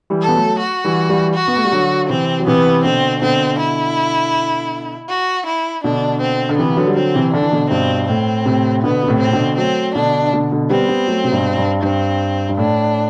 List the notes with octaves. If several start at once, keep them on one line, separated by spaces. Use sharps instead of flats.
E3 G3
A4
B3
F#3 A3
F#4
E3 G3
E3 G3
F#4
B3
A3
G3
D3 F#3
C3 E3 C4
F#3
C3 E3 B3
B2 D3 C4
B2 D3 C4
E4
F#4
E4
B2 D3 D4
C4
D3
C3 E3 B3
D3 F#3
G3
D3 F#3 C4
C3 E3
D3 D4
E3
B2 D3
G2 B2 C4
A2 C4
A2 C3
B2 D3 B3
B2
A2 C3
C4
C3
B2 D3
F#3 A3 C4
B2 D3 D4
B2 D3
B2 D3
G3 B3 C4
G3 B3
F#3 A3
C3
G2 B2
G2
G2 C4
G2
A2 D4